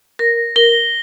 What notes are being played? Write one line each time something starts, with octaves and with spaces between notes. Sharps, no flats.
A#4 A#6
A#4 G7